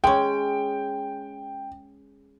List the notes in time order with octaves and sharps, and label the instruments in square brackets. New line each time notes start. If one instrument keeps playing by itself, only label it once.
[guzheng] G#3 C#4 [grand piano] G5